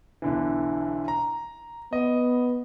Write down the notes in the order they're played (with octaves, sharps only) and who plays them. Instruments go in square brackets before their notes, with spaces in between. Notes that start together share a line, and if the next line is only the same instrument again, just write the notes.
[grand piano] B1 D3 E3
A#5
[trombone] B3 [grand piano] D#5